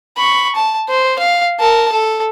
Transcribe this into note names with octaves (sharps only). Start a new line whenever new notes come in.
B5 C#6
A5
C5
F5
A#4 A5
A4